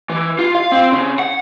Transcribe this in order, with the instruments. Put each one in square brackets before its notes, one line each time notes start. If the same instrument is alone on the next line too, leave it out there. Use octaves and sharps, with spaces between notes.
[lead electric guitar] E3
F4
F5
C4
C#3
F#5